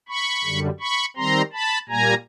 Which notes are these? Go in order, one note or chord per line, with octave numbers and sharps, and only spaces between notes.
B5 C#6
F#2 D3 G3
B5 C#6
D#3 G3 C4 A#5 C6
A5 B5
A#2 G3 A#3 G#5 A#5